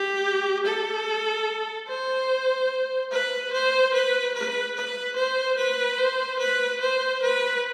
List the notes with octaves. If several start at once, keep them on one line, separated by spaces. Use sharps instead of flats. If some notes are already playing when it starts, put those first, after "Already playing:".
Already playing: G4
A4
C5
B4
C5
B4
B4
B4
C5
B4
C5
B4
C5
B4